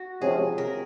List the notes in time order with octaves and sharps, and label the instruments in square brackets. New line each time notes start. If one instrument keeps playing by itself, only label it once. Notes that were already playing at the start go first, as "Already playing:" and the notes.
Already playing: [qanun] F#4
[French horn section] C3 F3 G#3 C#4 [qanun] G#4
[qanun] A#4